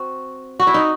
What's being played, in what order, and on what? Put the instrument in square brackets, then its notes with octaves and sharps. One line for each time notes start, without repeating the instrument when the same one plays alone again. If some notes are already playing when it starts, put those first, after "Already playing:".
Already playing: [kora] C4 F#4
F#4
E4
D#4